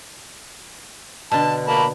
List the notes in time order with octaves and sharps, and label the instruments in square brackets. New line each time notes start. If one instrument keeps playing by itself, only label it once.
[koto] B2 D3 [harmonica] A5
[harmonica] A#3 A5 B5